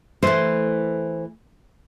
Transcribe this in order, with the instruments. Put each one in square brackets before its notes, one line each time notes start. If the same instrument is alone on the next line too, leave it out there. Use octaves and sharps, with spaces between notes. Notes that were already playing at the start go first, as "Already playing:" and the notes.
[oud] E3 A3 [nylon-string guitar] C5